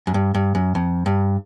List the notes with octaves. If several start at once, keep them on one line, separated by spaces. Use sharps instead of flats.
F#2
G2
G2
F#2
F2
G2